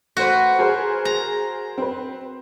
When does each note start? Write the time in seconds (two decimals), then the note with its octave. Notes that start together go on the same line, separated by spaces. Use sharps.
0.17 A3 F#4 B4 C5
0.59 G#4 A#4 C5
1.05 A#5
1.78 C4 B4